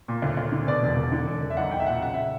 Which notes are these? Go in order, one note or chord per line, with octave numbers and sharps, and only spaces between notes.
A#2
D2
D2
D3
B2 D5
E1
E1
D3
E1
E1
E5
B1 F#5
B1 G5
E5
A#2 F#5
C#3 F#5
E5